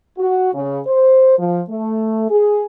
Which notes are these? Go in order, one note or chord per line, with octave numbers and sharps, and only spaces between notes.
F#4
C#3
C5
F3
A3
G#4